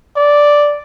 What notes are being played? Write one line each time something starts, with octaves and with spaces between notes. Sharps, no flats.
D5